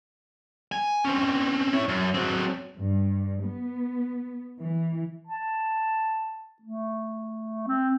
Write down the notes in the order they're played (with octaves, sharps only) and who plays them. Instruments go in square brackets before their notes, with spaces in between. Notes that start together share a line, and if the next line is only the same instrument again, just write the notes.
[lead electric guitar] G#5
C4 C#4
E4 C#5
F#2
F#3 C4
[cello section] G2
B3
E3
[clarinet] A5
A3
C4